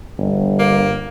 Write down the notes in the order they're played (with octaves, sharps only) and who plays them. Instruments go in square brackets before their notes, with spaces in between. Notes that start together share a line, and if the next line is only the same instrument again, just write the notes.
[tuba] G1
[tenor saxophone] A#3